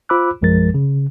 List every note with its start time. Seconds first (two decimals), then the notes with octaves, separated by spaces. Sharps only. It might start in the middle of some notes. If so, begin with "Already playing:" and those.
0.09 F4 C5 B5 D6 E6 F#6
0.42 A#1 F#2 F3 G#3 A#4 A6
0.74 C#3